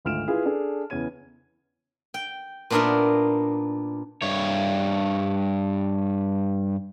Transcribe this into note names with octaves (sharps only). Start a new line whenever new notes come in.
G#1 D2 F4 F6 D7 E7
E4 F4 G#4 B4
D4 G#4 A4
E2 C#3 C#4 G#6 D#7
G5
A#2 B3 D4 D#4 A#4 E5
G2 C#5